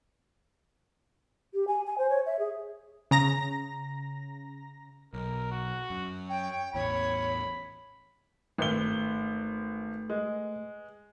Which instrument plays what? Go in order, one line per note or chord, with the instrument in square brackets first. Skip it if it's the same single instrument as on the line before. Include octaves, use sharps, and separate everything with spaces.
[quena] G4
G#5
G#5
C5
C#5
E5
G#4
[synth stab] C#3 A#5 A#6
[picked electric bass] B1 [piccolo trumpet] A#4
[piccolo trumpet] F#4
[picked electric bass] F#2
[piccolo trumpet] C#5 [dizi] G5
[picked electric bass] A1 E2 [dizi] C#5 [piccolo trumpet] B5
[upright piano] G#1 G7 [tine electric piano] A3 B4
[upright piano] G#3